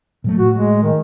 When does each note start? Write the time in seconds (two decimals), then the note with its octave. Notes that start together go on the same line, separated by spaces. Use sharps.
0.24 A#2 F#3 A3
0.39 A2 F#4
0.55 G#3
0.83 D#3